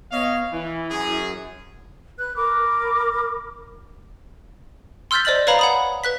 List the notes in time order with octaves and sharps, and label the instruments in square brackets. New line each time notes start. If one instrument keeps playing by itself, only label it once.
[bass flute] B3 [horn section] C#5 D#5 F5
[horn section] E3 [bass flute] E4
[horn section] F#2 G#4
[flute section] B4 F#6
A#4 B5 D6
[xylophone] C6 E6 F6 G6 A6 B6
C5 D5 D#5 A6 F#7
B4 C#5 F5 A#5 B5
F#5 B5 D#6
B4 F#6 B6